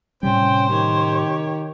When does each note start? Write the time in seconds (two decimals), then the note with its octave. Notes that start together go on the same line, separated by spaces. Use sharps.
0.23 A2 C3 G3 C#4 C5 G5
0.70 D#3 G4 C#5